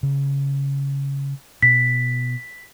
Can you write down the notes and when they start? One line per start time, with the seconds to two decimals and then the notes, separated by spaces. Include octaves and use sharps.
0.03 C#3
1.62 B2 B6